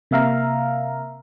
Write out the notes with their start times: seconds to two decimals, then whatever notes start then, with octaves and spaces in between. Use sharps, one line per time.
0.11 C3 A#3 E5 F5 A#5